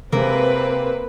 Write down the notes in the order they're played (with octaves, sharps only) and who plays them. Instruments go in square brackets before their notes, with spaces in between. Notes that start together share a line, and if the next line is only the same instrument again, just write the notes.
[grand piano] C3 G#3 [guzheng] A#3 [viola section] C4 B4